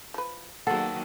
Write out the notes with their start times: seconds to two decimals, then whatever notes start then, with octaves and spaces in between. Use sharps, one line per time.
0.14 F3 B4
0.67 D#3 F#3 G#3 A#3 B3 A4 F#5